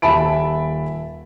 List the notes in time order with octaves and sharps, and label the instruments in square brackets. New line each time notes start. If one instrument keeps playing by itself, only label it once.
[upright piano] D#1 E5 A5 B5 D7